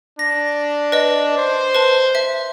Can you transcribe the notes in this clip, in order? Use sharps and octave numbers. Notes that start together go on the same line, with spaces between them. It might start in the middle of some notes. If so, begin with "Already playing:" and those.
D4 A#6
B4 D#5
C5
B4 A5
E5